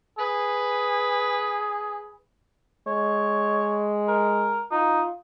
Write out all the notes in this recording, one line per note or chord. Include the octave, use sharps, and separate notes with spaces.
G#4 B4
G#3 C#5
A#4
D#4 F4